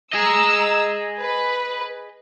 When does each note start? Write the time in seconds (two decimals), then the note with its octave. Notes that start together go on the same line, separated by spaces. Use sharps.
0.13 G#4 D#5 A#5 E6
1.19 B4